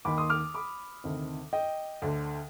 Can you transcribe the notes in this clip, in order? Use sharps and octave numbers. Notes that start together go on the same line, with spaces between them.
D#2 D#3 B5 D6
C6 D#6
D6 F6
B5 D6
D2 C3 D#3
D#5 G5
D2 D3